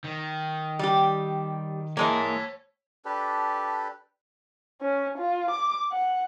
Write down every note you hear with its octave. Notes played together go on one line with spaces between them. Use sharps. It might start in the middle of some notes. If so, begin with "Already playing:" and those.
D#3
G3 G4
E3 G#3 A#3 C#5 A5
D4 G4 A4 B4
C#4
F4
D6
F#5